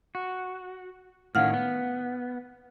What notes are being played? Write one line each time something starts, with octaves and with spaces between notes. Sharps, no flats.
F#4
A2 D#3 C#4 F5 F#5 F6
B3